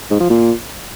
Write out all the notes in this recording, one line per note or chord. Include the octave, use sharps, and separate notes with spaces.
G#2
F3
A#2